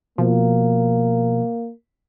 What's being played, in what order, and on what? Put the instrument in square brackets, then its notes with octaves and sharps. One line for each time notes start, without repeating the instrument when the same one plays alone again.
[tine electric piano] B2 [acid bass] F3 [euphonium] A#3